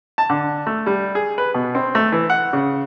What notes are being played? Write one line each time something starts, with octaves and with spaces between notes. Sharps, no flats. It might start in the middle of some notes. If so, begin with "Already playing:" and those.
A5
D3
A3
G3
G#4
B4
B2
C4
A3
E3
F#5
C#3